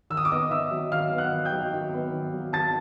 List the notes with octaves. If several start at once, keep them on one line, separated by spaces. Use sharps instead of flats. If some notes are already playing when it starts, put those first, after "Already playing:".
D#3 E6
D#6
D6
B3 D#5 D#6
D#3 E5 E6
F#3
D#3 F5 F6
B3
F#5 F#6
D#3
G5 G6
F#3
D#3
B3
D#3
F#3
D#3 A5 A6